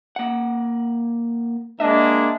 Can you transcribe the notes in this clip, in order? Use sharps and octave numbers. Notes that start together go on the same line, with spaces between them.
A#3 F#5
G#3 A#3 D4 D#5 E5